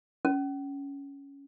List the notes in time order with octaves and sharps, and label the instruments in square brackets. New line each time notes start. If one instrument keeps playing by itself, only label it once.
[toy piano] C#4